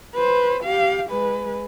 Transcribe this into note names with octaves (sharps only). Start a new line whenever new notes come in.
B4 C5
G4 F5
G#3 B4